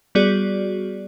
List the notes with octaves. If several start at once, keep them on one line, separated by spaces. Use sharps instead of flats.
G3 B3 F#4 G#4 D5